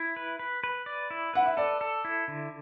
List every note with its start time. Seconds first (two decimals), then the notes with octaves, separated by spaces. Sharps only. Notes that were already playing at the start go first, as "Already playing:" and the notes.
Already playing: E4 E5
0.16 B4
0.39 B4
0.64 B4
0.86 D5
1.11 E4
1.34 B4 F#5
1.46 E5
1.57 A4 D5
1.81 A4
2.05 E4
2.28 D3